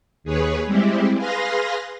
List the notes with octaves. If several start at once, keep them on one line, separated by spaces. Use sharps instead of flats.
D#2 G#4 B4 C#5
G3 G#3 C4 E4 G4
G#4 B4 F5 C6 A#6